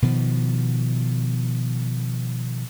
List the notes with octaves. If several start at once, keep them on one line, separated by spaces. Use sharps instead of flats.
B2 D#3 F3